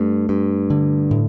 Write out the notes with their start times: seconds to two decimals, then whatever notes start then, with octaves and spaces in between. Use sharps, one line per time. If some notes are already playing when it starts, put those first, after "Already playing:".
Already playing: G2 A3
0.29 G2
0.70 D3
1.11 A2